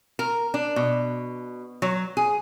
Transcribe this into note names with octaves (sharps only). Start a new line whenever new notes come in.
A#4
D4
B2
F#3
G#4